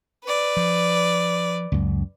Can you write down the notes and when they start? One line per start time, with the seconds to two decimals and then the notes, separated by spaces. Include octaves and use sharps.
0.24 B4 D5
0.57 F3
1.72 C#2 F#2